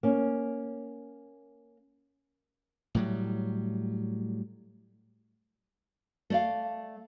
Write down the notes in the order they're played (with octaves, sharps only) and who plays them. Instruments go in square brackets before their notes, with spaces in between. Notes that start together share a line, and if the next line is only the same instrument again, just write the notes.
[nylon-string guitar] A#3 C#4
[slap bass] A2 F#3 G3
[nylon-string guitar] A3 D5 F5